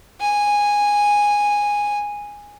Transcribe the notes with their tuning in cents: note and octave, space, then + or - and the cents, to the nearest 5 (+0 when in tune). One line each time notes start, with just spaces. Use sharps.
G#5 -10